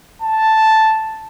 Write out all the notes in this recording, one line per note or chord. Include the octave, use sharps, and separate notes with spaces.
A5